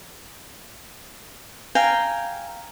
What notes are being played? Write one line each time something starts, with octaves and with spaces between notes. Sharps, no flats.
F5 G5 G#5 A#5